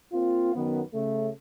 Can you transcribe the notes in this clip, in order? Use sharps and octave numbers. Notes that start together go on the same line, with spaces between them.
A#3 C4 F4
F#2 D#3 B3
C#3 A3